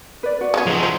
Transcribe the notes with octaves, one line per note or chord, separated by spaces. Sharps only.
B4 D5
F#4 D5
G#3 B3 C#4
F3 D#4
C5